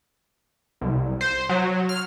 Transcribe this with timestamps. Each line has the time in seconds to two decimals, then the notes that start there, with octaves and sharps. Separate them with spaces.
0.81 C2
1.21 C5
1.49 F#3
1.89 F6